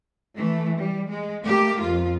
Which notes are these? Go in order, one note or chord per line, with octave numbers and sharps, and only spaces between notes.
E3 A3
G3
G#3
A3 A#3 G4
F2 F4